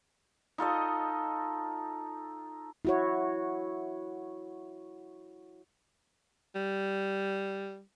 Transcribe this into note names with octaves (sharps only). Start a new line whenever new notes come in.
D#4 F4 A4 D#5
E4 F#4 C#5
G3